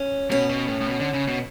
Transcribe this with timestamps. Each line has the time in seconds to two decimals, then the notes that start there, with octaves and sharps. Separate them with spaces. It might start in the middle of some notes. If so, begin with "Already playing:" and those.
Already playing: C#4
0.31 B2 C#4
0.50 B2
0.68 A2
0.81 A2
0.87 B2
1.00 D3
1.14 C#3
1.27 B2